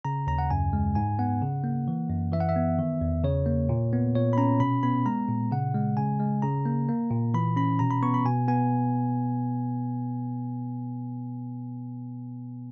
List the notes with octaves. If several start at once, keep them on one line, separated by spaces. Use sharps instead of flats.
C#3 A#5
D#2 A#5
F#5
F#2 G#5
G#3
G#2 G#5
B3 F#5
C#3
A#3
E3
F#2
E3 E5
F#5
E5
B3
D#3
E2
C#3 C#5
A#3
A#2
B3
A#2 C#5
B5
C#4 A#5
B2 B5
B3 B5
G#3 A#5
A#2
C#3 F#5
G#3
C#3 G#5
G#3
C#3 A#5
A#3
A#3
A#2
E3 B5
C#4 B5
B2 A#5
B5
B3 C#6
B5
B2 G#5
B3 G#5